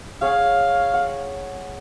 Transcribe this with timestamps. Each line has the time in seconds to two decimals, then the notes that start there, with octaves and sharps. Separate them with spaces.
0.22 G#4 C#5 F5 F#5
0.94 F#5